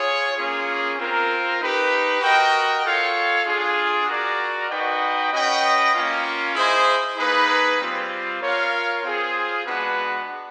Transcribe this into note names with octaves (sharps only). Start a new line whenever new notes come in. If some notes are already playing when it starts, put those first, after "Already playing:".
Already playing: F4 G#4 C#5
A#3 C#4 F4 G#4
C4 F4 A#4
D#4 G4 B4
F#4 A#4 D#5 G5
F4 A4 C#5 F5
D4 F4 G#4
F#4 A#4 D5
D#4 F#4 B4 D#5 G5
C#4 F#4 B4 D#5 G5
A#3 C#4 F4
E4 G#4 C5 D#5
A#3 D#4 G#4 B4
G3 C4 F4
F4 A#4 C#5 F5
C4 F4 G#4
G#3 B3 D4 F#4 B4